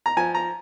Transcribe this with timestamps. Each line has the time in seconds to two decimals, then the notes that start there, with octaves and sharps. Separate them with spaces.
0.06 A#5
0.17 F3 G#5
0.35 A#5